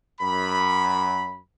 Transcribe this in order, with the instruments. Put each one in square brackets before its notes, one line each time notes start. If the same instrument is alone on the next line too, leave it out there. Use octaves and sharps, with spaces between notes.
[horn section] F#2 B5